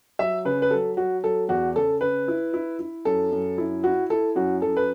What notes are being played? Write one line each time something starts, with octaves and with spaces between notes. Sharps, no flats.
F#3 E5
C#3 B4
B4
F#3 A4
F#3 F#4
F#3 A4
E2 F#4
C#3 A4
C#3 B4
E4
E4
E4
F#2 A4
F#2
E4
E4 F#4
E4 A4
F#2 F#4
F#2 A4
B4